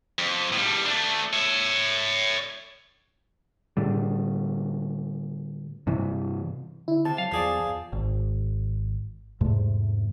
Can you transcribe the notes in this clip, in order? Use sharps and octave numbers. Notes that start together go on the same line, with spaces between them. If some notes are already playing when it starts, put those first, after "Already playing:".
F2
A2 G3
A3 D4
C#5 E5
A2 D3 G3
G2 C3 E3
D3 E4
C3 A5
F#3 F5
E2 F3 G#4 D5
E2
G#1
E2 G#2 C3 A3